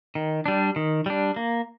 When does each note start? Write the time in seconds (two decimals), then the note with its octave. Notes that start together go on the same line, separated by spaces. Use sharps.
0.15 D#3
0.46 G3 D4
0.76 D#3
1.06 G3 D4
1.36 A#3